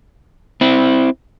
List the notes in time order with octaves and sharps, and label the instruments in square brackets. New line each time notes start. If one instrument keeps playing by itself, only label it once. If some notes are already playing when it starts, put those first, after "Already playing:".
[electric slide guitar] C4 E4